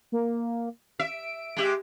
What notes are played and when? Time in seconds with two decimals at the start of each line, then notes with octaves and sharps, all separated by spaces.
0.12 A#3
1.00 E5 D7
1.57 G#3 G4 E5